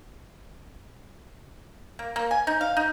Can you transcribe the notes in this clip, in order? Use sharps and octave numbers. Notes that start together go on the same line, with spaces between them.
A#3
A#3
G#5
D#4
F5
D#4